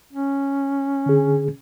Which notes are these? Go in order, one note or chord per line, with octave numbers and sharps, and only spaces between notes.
C#4
D3 G#4